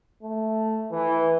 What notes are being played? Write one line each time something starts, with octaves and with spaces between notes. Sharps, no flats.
A3
E3